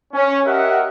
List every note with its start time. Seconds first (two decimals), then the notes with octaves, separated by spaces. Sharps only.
0.14 C#4
0.46 G4 A#4 D#5 E5 F#5